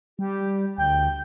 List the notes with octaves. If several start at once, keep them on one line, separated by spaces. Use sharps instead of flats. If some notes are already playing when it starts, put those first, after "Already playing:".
G3 G4
D2 G5 G6